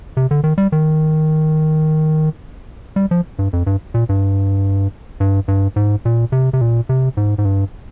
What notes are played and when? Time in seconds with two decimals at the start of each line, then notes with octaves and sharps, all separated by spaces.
0.17 C3
0.31 D3
0.44 D#3
0.58 G3
0.72 D#3
2.96 G3
3.11 F3
3.39 G2
3.53 F2
3.67 G2
3.94 A#2
4.09 G2
5.20 G2
5.48 G2
5.76 G#2
6.05 A#2
6.32 C3
6.53 C3
6.61 A#2
6.89 C3
7.17 G#2
7.38 G#2
7.45 G2